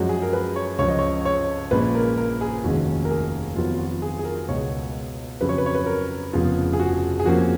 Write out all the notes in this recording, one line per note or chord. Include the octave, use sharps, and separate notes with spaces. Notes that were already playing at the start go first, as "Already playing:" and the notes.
Already playing: F#2 F3 G#3 F#4
G#4
A#4
B4
C#5
C#2 C#3 F3 C#5
D#5
C#5
C#5
A#1 A#2 G#3 C#4 B4
A#4
A#4
G#4
F1 D#2 D#3 G#3 C#4 F#4
A#4
G#4
F2 D#3 F#3 B3 F4
F4
F#4
G#4
G#4
A#4
C#2 B2 G#3 B3 C#5
F2 C#3 F#3 C#4 B4
C#5
B4
C#5
B4
A#4
F1 F2 C#3 F3 B3 F4
G#4
F#4
G#4
F2 F3 A#3 C#4 F#4